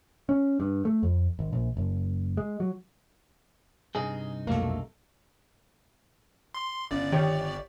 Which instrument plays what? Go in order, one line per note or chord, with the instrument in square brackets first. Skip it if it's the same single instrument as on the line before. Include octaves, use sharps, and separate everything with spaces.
[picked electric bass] C#4
G2
A3
F2
G#1
A#1
F#1
G#3
F#3
[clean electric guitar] G2 C3 D#4 [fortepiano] G#4
[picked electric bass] B1 F2 F#3 [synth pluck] A3 A4 [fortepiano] A#3
[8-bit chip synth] C6
[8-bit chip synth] G1 D5 [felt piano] C#3
[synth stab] D#3 [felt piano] G4 C#5